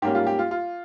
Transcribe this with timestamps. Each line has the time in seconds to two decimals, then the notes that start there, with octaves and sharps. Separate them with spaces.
0.02 G#2 G3 A#3 C#4 G4
0.15 F4
0.27 G4
0.39 F4
0.51 F4